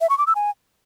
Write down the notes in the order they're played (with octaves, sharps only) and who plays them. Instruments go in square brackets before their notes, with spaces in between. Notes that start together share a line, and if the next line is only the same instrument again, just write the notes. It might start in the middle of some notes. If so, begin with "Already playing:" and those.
[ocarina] E5
C#6
D6
E6
G#5